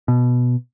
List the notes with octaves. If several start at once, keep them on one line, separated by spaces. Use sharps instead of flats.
B2